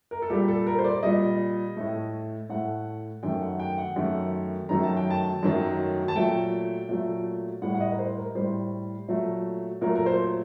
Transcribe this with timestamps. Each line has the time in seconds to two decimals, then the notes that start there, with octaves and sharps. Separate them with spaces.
0.11 A#4
0.22 A4
0.30 A#2 G3 G4
0.48 A4
0.67 A#4
0.78 C5
0.85 D5
1.03 A#2 G3 D#5
1.76 A2 A3
2.50 A2 A3 F#5
3.23 F#2 D#3 A3 G5
3.41 F#5
3.59 G5
3.78 F#5
3.96 F#2 D#3 A3
4.69 F#2 D#3 F#3 A3 A#5
4.83 A5
4.97 G5
5.10 A5
5.43 F#2 D#3 F#3 A3
6.08 A5
6.15 A#2 F#3 A3 G5
6.89 A#2 F#3 A3
7.62 A2 G3 F#5
7.74 F#5
7.80 D#5
7.91 A#4
7.99 C5
8.17 A#4
8.35 A2 G3 C5
9.08 A#2 F#3 A3
9.81 A#2 F#3 A3 A#4
9.95 A#4
10.06 C5